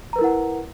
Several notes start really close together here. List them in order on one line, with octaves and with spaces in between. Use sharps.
A#5 B4 A#4 E4 F#5